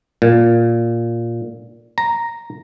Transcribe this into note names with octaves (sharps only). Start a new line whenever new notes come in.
A#2
A#5